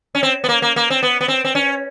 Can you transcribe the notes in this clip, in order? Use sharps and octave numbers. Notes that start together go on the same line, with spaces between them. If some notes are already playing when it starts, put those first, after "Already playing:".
C#4
C4
B3
A#3
A#3
A#3
C4
B3
B3
C4
C4
C#4